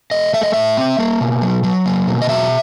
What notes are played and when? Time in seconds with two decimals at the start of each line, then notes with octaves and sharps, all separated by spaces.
0.11 A3 D#5
0.34 A3 E5
0.43 D#5
0.53 A2 E5
0.77 C4
0.99 A#3
1.21 B2
1.42 F#3
1.64 F#3
1.86 A#3
2.07 B2
2.22 D#5
2.28 F#3 E5